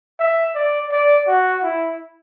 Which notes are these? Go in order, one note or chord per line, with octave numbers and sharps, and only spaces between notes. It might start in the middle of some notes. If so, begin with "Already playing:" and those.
E5
D5
D5
F#4
E4